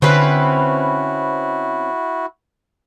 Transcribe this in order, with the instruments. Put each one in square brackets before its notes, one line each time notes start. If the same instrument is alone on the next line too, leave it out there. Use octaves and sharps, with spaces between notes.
[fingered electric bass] D3 [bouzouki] C4 C#4 B4 [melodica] E4 F#4